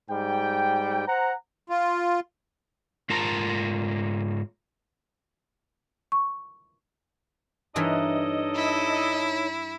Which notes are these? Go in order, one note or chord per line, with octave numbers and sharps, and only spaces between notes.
G#2 G3 G5
C5 F#5 A#5
F4
G#2 F4 A#4 A5 A#5
C#6
G2 E3 D4 D#4 A4 A#4 C#5 D#5
E4